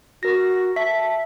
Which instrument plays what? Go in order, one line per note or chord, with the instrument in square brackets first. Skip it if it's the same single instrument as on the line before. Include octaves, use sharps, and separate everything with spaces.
[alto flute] F#4 [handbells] A#4 A#6
[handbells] E5 B6 [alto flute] A5